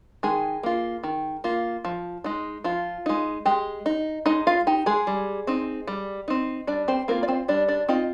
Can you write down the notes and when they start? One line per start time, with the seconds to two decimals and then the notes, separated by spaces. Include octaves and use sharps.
0.23 D#3 G#3 G#4
0.63 A#3 F4
1.03 D#3
1.44 A#3 F4
1.85 F3
2.24 G#3 D#4
2.64 F3 F4
3.06 G#3 D#4
3.45 G#3 G4
3.86 D#4
4.26 G#3 D#4 D#5
4.47 F4 F5
4.67 D#4 G4
4.86 G#3 G#4
5.07 G3
5.47 C4 D#4
5.87 G3
6.28 C4 D#4
6.67 G3 D4 D5
6.88 C4 C5
7.08 A#3 C4 F4 A#4
7.23 D5
7.28 C4 C5
7.48 G3 D4 D5
7.68 D4 D5
7.89 C4 D#4 F4 D#5